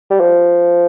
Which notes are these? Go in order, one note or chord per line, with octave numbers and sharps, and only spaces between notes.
G3
F3